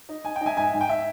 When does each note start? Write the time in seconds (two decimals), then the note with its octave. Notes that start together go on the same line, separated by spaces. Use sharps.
0.09 D#4
0.25 D#4 G#5
0.36 G5
0.41 D#4
0.46 E5 G#5
0.57 G#2 E5 G#5
0.73 G#2
0.81 G5
0.89 E5